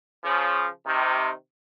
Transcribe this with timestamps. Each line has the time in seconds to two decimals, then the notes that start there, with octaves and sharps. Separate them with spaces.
0.24 C#3 F3
0.86 C3 D#3